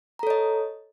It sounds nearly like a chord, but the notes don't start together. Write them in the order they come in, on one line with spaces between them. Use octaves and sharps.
A#5 A4 C#5 D#5